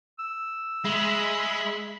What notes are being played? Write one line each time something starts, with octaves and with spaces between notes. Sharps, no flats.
E6
G#3 E5 B5